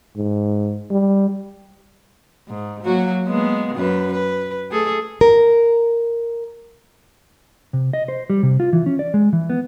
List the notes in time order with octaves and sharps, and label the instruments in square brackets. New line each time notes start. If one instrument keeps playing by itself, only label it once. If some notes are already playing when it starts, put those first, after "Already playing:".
[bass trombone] G#2
G3
[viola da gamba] G#2
F#3 A#3 F#4
G#3 A#3 B3
F#2 B4
B4
A3 G#4 A4
[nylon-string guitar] A#4
[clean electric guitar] C3
D#5
C5
G3
C3
F4
E3
C#4
D5
G#3
E3
B3